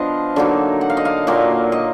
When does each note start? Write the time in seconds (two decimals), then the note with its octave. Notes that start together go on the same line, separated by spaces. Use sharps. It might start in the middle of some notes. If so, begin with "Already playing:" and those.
Already playing: F3 B3 D4 D#5 F5
0.36 D3 F#3 A#3 D#4
0.81 F#5
0.90 F5
0.97 D#5
1.05 F5
1.27 A#2 F#3 A#3
1.72 D#5